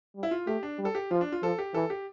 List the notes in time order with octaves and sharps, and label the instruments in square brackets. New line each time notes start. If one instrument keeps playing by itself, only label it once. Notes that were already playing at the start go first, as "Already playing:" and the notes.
[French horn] G3
[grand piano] E4
F4
[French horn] A3 [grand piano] G4
[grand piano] D4
[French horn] G3
[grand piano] A4
G4
[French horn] F3 [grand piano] F4
[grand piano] D4
F4
[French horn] F3 [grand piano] A4
[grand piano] G4
[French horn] E3 [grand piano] A4
[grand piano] G4